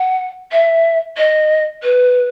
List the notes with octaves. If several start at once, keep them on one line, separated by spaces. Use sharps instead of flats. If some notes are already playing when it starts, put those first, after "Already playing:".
Already playing: F#5
E5
D#5
B4